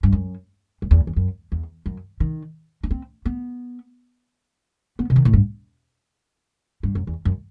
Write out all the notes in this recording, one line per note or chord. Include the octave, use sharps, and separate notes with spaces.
G2
F#2
F#2
E2
E2
F#2
E2
F#2
D#3
D#4
C4
B3
B3
C3
D#3
A2
G2
G2
F#2
E2
F#2